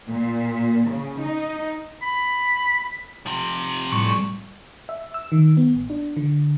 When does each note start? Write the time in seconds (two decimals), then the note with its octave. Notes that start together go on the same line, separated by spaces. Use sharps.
0.11 A#2
0.91 C#3
1.22 D#4
2.02 B5
3.26 C3 F3
3.92 A2 G3 C#6
4.89 E5
5.14 E6
5.32 D#3
5.57 B3
5.75 A1
5.90 D4
6.17 D3